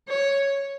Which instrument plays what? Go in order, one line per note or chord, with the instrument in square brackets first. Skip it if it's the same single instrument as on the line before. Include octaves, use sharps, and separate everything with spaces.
[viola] C#5